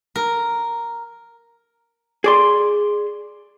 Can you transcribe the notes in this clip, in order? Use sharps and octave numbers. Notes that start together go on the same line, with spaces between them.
A#4
G#4 D5 C6